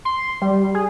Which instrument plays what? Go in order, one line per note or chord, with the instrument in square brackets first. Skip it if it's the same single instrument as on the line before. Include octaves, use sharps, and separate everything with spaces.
[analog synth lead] C6
G3
G#4